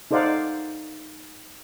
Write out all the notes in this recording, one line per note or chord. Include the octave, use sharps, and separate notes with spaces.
D#4 A4 C5 D5 F5 F#5